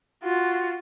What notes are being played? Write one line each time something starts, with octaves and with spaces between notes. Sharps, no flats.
F4 F#4